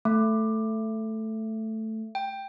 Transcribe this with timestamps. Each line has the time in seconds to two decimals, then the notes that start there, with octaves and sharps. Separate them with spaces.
0.05 A3
2.15 G5